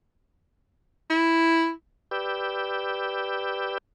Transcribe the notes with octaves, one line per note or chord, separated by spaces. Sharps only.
E4
G4 B4 D5 E6 G6